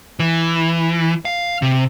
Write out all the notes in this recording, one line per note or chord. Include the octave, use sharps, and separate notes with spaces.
E3
F5
C3